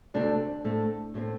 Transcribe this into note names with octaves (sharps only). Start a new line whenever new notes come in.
D2 C3 A3 C4 D4
A2 A3 C4
A2 A3 C4